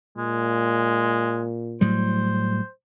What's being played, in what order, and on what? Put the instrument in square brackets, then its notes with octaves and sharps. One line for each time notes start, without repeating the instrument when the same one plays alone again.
[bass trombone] A#2 [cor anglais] G#3
[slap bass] A2 F#3 G3 [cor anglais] C5